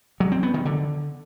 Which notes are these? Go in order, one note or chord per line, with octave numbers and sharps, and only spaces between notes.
F#3
C4
B3
D#3
D3